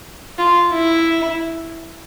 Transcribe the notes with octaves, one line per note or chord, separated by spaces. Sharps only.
F4
E4